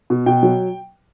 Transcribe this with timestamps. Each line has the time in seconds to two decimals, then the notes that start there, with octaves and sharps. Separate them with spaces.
0.10 B2
0.26 B2 G5
0.43 F#3